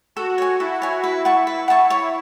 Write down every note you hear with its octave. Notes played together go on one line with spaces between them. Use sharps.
F#4 A4
C#5 G#5
E4 A4
C#5 G#5
E4 B4
F#5 A5 C#6
B4
F#5 A5 C#6
C#5